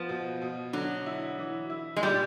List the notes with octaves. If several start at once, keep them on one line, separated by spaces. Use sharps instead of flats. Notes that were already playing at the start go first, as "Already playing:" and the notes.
Already playing: F3 B3
B2
B2
D3 F#3
E4
E3
E4
G#3
A#2 G3